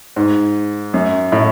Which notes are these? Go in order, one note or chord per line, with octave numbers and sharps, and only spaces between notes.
G#2
F#2
A2